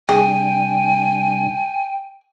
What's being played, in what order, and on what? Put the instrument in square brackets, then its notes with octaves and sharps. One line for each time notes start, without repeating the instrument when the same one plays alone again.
[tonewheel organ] C3 G3 D4 [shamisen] G#4 [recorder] G5 [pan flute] G#5